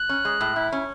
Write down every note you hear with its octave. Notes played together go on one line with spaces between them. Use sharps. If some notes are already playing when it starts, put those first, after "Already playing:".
Already playing: F#6
C#4
G#3
A2
E4
C#4